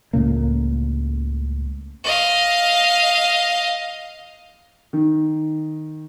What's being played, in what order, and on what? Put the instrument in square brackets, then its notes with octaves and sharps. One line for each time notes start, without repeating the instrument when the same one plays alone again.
[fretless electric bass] C#2 A2 C#3 A#3
[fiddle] D#5 F5
[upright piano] D#3